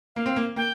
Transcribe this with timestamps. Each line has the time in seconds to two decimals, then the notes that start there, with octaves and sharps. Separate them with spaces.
0.16 A#3 F5
0.26 C4
0.36 A#3
0.56 A#3 G5